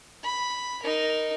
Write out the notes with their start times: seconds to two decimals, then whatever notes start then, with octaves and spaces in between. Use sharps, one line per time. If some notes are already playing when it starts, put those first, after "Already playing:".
0.23 B5
0.83 D#4 A#4